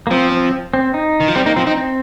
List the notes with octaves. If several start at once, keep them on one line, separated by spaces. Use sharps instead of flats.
A#3
F3 C4
C4
C4
D#4
D#3
F3
G3 C4
A#3 D#4
F3 C4
C4 D#4
C4